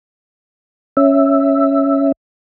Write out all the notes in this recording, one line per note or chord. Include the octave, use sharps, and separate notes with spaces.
C#4 E5